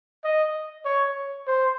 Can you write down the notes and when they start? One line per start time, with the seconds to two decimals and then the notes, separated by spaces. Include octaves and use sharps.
0.24 D#5
0.85 C#5
1.47 C5